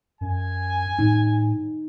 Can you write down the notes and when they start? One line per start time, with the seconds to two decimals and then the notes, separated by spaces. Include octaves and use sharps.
0.21 F#2 G#5
0.99 A2 D#4